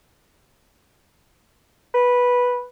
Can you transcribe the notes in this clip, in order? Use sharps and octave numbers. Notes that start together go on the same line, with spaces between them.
B4